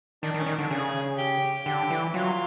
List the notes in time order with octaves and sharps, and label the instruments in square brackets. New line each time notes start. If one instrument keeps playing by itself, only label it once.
[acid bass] D#3 [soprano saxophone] D4
[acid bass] D#3
[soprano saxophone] C#4
[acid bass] D#3
[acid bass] D3 [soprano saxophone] D4
[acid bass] C#3 [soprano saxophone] G#4
[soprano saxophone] G4
[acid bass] D3 [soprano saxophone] G4
[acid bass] E3
[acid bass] F#3 [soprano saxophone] F4